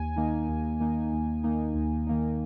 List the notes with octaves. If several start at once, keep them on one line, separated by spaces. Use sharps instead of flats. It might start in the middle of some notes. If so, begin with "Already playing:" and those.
Already playing: D#2 G#5
D#3 A#3 D#4
D#2
D#3 A#3 D#4
D#2
D#3 A#3 D#4
D#2
D#3 A#3 D#4